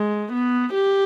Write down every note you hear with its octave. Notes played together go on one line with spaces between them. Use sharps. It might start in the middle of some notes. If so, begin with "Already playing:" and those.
Already playing: G#3
B3
G4